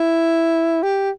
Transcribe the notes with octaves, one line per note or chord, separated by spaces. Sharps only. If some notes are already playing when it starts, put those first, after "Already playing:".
Already playing: E4
G4